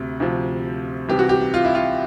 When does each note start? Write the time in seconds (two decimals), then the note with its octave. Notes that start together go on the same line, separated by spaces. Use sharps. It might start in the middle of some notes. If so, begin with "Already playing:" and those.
Already playing: D2 C3
0.20 D2 C3 F3
1.09 C2 C3 E3 G4
1.19 F#4
1.29 G4
1.54 F4
1.65 E4
1.75 F4